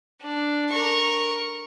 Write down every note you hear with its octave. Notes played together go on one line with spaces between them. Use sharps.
D4
A#4 C#6